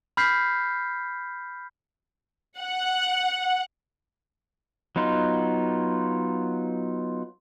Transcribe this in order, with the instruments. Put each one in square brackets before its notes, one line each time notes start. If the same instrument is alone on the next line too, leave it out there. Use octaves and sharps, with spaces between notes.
[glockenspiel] B5 F6 G6 B6 C7
[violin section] F#5
[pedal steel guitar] F#3 B3 D#4 F4